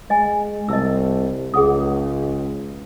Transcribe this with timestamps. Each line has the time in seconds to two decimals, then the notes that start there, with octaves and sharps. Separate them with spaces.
0.10 G#3 D#5 G#5
0.69 C2 D#5 A5 E6
1.54 C#2 G#4 F#5 D#6